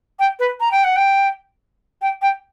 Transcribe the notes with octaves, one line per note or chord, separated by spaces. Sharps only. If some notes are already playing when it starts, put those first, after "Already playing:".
G5
B4
A#5
G5
F#5
G5
G5
G5